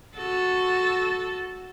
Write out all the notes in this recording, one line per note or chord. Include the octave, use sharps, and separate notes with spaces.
F#4 A4